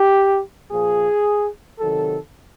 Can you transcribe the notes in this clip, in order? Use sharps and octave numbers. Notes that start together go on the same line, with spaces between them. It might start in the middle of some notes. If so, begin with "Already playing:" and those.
Already playing: G4
A#2 F3 G#4
C3 D#3 F#3 A4